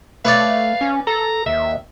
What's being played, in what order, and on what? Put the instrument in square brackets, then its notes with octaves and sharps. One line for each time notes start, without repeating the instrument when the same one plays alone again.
[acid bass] A3 [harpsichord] B4 C#5 D5 [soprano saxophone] F5
[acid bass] C#4
[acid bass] A4 [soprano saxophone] A#5
[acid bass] D#2 [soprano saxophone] E5